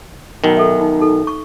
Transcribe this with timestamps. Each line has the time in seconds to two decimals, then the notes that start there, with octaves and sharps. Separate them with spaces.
0.44 B1 D#3
0.57 A4 E5
0.79 D#4
0.99 D#4 A4
1.27 C#6